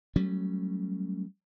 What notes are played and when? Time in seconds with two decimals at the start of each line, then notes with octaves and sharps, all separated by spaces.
0.16 F#3 G3 A3 C#4